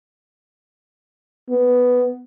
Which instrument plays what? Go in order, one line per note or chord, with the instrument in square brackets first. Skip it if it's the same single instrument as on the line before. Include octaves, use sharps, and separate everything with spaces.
[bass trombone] B3